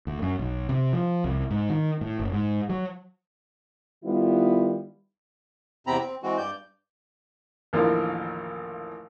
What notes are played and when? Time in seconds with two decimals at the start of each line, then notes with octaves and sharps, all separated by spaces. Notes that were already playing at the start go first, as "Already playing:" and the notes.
0.07 D2
0.22 F#2
0.39 B1
0.69 C3
0.93 F3
1.24 C2
1.51 G#2
1.70 D#3
2.01 A2
2.19 F#1
2.33 G#2
2.70 F#3
4.04 D#3 G3 B3 E4 F4
5.87 E2 C3 C4 A#5 B5
6.01 C4
6.23 E3 G#3 C4 F#4
6.38 G2 D5 G6
7.73 A1 D#2 D3 E3 F3 A#4